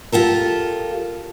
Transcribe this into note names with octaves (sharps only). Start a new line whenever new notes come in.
F4 G4 A4 A#4